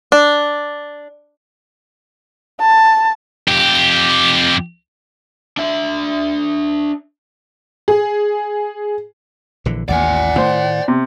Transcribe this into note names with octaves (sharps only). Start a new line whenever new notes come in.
D4
A5
F2 G4
D4 E5
G#4
A#1 D3 E3
A1 D#2 D5 F#5 G#5
A2 D#3 A3 C5
C3